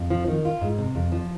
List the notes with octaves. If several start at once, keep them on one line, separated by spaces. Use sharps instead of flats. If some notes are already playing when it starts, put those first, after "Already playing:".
Already playing: F2
F3
D#3
F4
G#2
C3
F2
F3